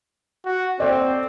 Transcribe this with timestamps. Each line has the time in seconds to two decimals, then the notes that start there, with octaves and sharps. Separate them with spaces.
0.45 F#4
0.80 C4 A4 D5